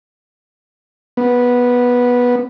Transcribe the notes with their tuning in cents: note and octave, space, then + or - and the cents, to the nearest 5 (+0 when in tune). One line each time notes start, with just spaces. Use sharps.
B3 -10